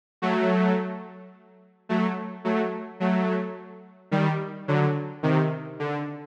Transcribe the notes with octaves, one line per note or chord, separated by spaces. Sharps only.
F#3 A3
F#3 A3
F#3 A3
F#3 A3
D#3 G3
D3 F#3
C3 D#3
D3